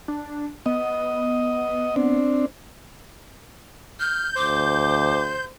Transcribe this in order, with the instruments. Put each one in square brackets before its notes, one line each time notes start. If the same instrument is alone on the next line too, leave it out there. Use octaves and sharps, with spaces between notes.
[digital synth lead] D4
[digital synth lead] B3 [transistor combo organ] D#5
[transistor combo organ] C4 D4
[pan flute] F6 [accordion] G6
[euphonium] D2 [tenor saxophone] C5 [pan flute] D6